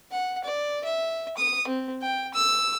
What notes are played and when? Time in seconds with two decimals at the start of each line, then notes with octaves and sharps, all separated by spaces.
0.11 F#5
0.44 D5
0.84 E5
1.37 D#6
1.67 C4
2.02 G5
2.34 E6